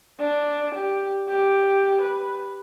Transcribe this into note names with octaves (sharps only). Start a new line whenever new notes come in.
D4
G4
G4
B4